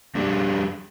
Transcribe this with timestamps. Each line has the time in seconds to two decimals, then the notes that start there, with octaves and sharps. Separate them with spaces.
0.15 F2 G3 D4 G4 G#4